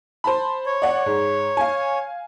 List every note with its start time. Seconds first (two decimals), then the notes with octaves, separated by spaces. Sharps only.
0.24 C5 A5 B5
0.66 C#5
0.82 D5 F#5
1.06 G#2
1.57 F5 G#5